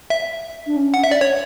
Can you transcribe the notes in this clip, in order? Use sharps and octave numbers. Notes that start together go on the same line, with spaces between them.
E5
D4
C#4
F#5
E5
D5
C#5